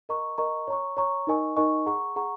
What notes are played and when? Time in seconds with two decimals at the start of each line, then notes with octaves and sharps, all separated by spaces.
0.09 A#4 D#5 A#5 C#6
0.38 A#4 D#5 A#5 C#6
0.68 C#5 A#5 C#6
0.97 C#5 A#5 C#6
1.27 D#4 A#4 D#5 G#5 C#6
1.56 D#4 A#4 D#5 G#5 C#6
1.86 G#4 F#5 A#5 C#6
2.16 G#4 F#5 A#5 C#6